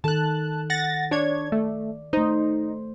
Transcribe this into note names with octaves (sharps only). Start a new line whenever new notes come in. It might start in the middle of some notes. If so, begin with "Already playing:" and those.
D#3 A4 A5 F#6
F#5 A6 A#6
D4 C#5 D5 G#6
A3
A3 D#4 C5